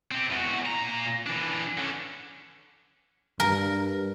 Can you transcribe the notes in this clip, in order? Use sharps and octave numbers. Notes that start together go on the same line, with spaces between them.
C4 G4
E2 F#4
A#2 A#5
E3 D4
D3 C#4
G2 A#4